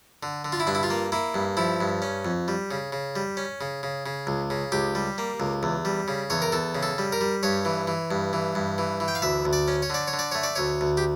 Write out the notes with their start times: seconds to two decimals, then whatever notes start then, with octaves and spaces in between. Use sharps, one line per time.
0.23 D3
0.45 D3
0.52 F4
0.60 E4
0.67 G2 D4
0.75 E4
0.83 F4
0.90 A#3
1.12 A#3 E4
1.34 G2
1.57 F3 E4
1.81 G2
2.02 C#4
2.25 F2
2.48 G3
2.71 C#3
2.92 C#3
3.16 G3
3.37 C#4
3.61 C#3
3.83 C#3
4.06 C#3
4.27 C#2
4.50 C#3
4.72 C#2 G4
4.95 G3
5.18 A#3
5.40 C#2
5.63 E2
5.85 G3
6.08 C#3
6.30 E2 C#5
6.42 A#4
6.52 E2 A4
6.75 C#3
6.83 A4
6.98 G3
7.12 A#4
7.21 G3
7.43 G2 C#5
7.65 E3
7.88 E3
8.11 G2
8.33 E3
8.55 G2
8.78 E3
9.00 E3
9.08 G5
9.15 F5
9.22 D2 E5
9.45 D2
9.53 D5
9.68 C#4
9.82 C#5
9.90 D3 D5
10.07 C#5
10.13 D3
10.19 D5
10.31 A3 C#5
10.43 D5
10.56 D2 C#5
10.81 D2
10.97 G4